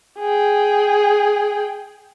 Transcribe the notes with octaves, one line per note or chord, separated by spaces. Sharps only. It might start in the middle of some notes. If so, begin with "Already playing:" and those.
G#4 G5